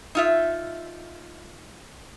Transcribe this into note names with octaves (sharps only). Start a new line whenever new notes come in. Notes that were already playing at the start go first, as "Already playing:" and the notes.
D#4 F4 E5